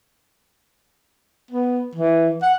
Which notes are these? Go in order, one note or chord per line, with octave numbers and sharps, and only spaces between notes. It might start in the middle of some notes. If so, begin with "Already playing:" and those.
B3
E3
F#5